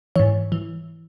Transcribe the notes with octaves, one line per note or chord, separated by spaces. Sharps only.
G#2 E3 C#5
E3